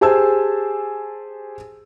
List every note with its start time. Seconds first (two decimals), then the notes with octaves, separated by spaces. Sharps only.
0.01 G4 G#4 C5 G#5 A5 E6